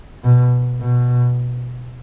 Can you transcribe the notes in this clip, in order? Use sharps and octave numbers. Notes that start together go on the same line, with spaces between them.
B2
B2